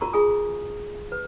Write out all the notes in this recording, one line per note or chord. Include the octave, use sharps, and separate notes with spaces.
F4 F#4 A#4 A#5 C#6
F4 G#4 G#5 D#6
B4